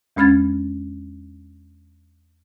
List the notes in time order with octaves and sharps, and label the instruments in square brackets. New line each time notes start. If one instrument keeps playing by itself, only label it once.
[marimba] E2 G#3 C#4 F6 G#6 A6